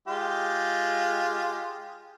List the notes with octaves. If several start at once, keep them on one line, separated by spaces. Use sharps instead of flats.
G#3 F4 G4